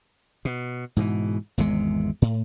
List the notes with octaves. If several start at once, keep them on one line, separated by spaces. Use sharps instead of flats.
B2
G#2 B2 D#3 E3
G#1 E2 C3 G#3
A2